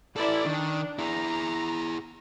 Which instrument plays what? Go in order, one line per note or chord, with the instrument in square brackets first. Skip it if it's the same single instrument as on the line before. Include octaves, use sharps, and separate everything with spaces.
[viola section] E4 D5 [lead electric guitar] A4 B4
[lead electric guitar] D#3 [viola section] D4
[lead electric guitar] E4 G#4 [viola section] A#5